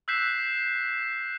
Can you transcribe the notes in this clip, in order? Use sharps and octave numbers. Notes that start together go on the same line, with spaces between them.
E6 F#6 G6 B6 C7 E7